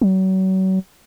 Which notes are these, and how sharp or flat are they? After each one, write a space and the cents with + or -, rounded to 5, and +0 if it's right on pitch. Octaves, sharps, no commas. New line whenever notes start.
F#3 +35